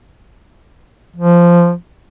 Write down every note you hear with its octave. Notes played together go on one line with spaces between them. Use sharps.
F3